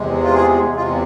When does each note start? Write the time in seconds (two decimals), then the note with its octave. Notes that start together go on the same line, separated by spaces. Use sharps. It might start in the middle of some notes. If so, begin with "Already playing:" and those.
Already playing: E2 C3 G#3
0.23 F4
0.34 G#4
0.76 E2 C3 G#3 F4